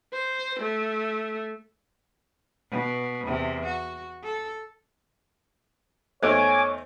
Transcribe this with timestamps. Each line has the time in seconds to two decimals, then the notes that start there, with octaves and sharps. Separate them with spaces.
0.13 C5
0.59 A3
2.71 B2
3.26 E2 C3
3.65 F#4
4.24 A4
6.23 E2 A3 D#4 C5 C#5 G#5 D6